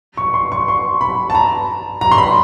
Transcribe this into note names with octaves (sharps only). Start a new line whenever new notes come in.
C#6
C6
C#6
C6
B5
A5
A#5
A#5
C6
B5